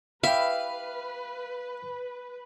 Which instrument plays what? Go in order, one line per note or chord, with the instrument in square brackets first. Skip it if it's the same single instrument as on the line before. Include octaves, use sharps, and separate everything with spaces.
[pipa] E4 G4 [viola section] B4 [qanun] E5 [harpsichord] F5